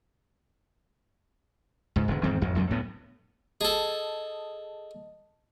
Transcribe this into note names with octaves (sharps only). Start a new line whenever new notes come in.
C#2 G#2
E1 D3 G#3
E2 G#2 D#3 C4
A1 F2
A1 F2 C#3 G3
D2 A2 B3
G#4 A4 D#5 A5